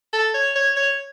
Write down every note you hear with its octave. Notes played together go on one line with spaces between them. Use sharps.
A4
C#5
C#5
C#5